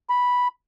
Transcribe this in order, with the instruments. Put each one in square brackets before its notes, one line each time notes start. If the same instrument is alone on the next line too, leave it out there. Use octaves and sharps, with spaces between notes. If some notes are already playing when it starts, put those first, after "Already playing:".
[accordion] B5